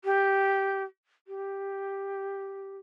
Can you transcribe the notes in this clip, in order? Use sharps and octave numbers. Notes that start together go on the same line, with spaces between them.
G4
G4